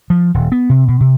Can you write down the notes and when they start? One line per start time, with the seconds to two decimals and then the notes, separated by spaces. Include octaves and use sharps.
0.10 F3
0.34 D#1
0.52 B3
0.70 C3
0.88 B2
1.01 C3